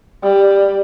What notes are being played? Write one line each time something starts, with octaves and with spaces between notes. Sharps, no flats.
G3